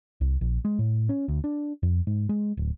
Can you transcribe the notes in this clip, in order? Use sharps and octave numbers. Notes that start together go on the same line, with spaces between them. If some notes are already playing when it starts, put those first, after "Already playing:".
C2
A#1
G#3
A2
C#4
D2
D4
F2
G#2
G#3
D1